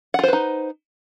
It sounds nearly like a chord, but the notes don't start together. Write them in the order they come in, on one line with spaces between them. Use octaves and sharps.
F#5 F4 C5 B4 D#4